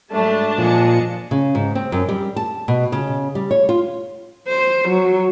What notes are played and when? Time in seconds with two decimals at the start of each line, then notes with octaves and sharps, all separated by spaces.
0.12 G#2 F#3 G3 A3 D4 A5
0.58 A#2 F3 G#4 D#5 C#7
1.31 C#3
1.55 G#2
1.75 C4
1.92 F#2
2.09 G3
2.36 A5
2.68 B2
2.92 C#3
3.35 G3
3.51 C#5
3.69 F4
4.48 C5
4.89 F#3